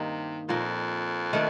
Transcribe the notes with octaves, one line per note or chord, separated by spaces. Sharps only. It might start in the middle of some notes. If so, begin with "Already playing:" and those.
Already playing: G2 C3 D#3 A#3 D#4
F2 A#2 F3 A#3
D#3 A3 D4